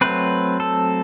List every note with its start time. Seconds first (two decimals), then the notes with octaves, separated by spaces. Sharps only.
0.01 F#3 A3 C4 B4
0.60 A4